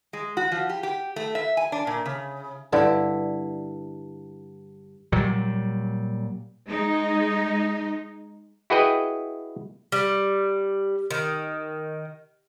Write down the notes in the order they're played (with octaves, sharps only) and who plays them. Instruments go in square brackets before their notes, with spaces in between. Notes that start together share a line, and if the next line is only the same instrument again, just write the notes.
[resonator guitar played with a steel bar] G#3
F#4
F3
G4
G4
A3
E5
G#5
D4
A#2
C#3
[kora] G2 D3 E4
[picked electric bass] A#2 F#3 G3
[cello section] G#3 D#4
[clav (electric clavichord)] E4 F#4 G#4 B4 D#5 G5
[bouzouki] G3
D#3